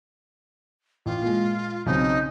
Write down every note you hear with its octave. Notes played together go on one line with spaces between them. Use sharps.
A1 F4
A#2 G#3
B1 C#3 C4 D#4